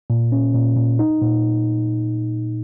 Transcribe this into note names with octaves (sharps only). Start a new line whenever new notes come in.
A#2
C#4
A#2
A#2
D#4
A#2